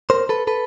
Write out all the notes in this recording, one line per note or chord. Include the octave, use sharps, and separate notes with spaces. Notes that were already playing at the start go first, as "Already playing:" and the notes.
A#4 C5
A4 B4
A4 B4